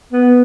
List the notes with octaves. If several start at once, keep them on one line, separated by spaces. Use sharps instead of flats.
B3